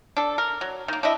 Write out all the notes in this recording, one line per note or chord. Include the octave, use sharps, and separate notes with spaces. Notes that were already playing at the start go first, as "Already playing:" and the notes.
D4 A4
A#4
F#3
D#3 A#3
D4 E4 D#5 E5